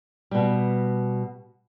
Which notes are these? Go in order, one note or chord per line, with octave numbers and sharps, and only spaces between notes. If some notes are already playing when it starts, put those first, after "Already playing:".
B2 G3